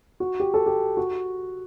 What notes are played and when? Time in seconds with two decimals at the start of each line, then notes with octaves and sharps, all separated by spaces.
0.20 F#4
0.40 G4
0.54 A4
0.66 G4
0.97 F#4